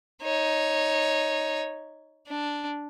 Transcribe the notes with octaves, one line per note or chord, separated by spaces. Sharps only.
D#4 C#5
D4